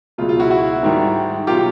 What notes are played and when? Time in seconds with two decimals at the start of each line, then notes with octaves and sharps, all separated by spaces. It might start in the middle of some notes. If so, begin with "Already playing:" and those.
0.18 C#2 B2 F#3 F4
0.29 F4
0.40 E4 F#4
0.51 E4 F#4
0.83 G#2 D#3 G3
1.47 B2 F#3 F4 G4